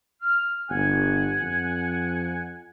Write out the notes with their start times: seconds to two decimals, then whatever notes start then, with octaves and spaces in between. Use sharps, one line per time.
0.22 F6
0.70 G1 F#5 G#5
1.42 F2